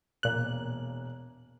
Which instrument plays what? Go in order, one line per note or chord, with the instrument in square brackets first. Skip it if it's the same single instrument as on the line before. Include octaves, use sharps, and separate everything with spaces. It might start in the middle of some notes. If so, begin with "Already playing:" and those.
[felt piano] E1 A#3 [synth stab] A#2 F#6